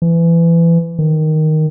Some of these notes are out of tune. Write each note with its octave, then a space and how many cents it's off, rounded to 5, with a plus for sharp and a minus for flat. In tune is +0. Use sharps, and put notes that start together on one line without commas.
E3 +25
D#3 +0